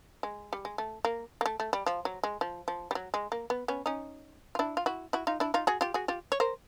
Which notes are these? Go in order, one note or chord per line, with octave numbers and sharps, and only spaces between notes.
G#3
G3
G#3
A3
A#3
A#3
A3
A3
G3
F3
F#3
G#3
F3
F3
G3
F#3
G#3
A#3
B3
B3 C#4
C#4 D#4
F4
D4 E4
F4
E4 F#4
E4 F#4
D#4 F4
D4 E4
D#4 F4
F#4 G#4
F4 G4
F#4 G#4
F4 G4
C#5
A#4 C5